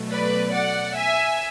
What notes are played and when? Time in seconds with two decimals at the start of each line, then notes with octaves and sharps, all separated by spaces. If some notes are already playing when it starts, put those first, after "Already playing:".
Already playing: B2 F#3 A3
0.11 B4 D5
0.53 D5 F#5
0.97 E5 G#5